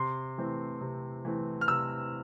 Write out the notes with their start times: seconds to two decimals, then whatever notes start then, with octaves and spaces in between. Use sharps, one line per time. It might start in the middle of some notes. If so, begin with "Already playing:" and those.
Already playing: C3 C6
0.38 E3 A3 C4
0.81 C3
1.25 E3 A3 C4
1.61 F6
1.68 C3 E6